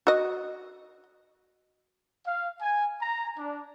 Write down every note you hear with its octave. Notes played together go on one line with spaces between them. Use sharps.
F#4 D#5
F5
G#5
A#5
D4